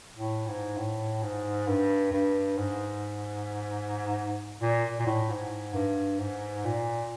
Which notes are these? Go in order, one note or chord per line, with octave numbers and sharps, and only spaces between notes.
A2
G#2
A2
G#2
G2
G2
G#2
A#2
A#2
A2
G#2
G2
G#2
A#2